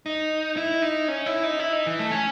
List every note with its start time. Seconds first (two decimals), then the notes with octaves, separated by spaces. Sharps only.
0.06 D#4
0.57 E4
0.82 D#4
1.08 C#4
1.26 E4
1.43 D#4
1.59 E4
1.73 D#4
1.86 E3
1.99 A3
2.11 C#4